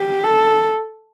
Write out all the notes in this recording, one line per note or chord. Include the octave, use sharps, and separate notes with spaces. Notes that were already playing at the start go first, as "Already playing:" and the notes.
Already playing: G4
A4